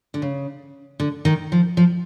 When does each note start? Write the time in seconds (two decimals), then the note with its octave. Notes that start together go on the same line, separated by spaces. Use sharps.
0.14 D3
0.22 C#3
1.00 D3
1.25 D#3
1.52 F3
1.77 F3